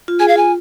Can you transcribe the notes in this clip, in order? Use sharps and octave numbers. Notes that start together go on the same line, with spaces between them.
F4
G#4 G#5
F5
F4 G#5